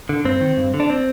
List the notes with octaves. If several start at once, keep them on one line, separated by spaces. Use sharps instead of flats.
D3
G2 C4
D#3
G2
D3
D4
C4